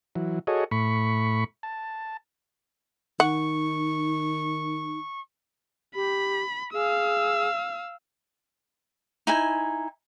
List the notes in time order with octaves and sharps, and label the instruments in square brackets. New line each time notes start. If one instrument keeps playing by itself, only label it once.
[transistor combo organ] E3 F#3
F#4 G#4 A4 C#5 D#5
A2 B5 C#6
A5
[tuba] D#3 [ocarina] D#4 [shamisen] F#5 [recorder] C#6
[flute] G4 [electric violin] B5
[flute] G#4 [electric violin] F5 E6
[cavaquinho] D#4 E4 G#5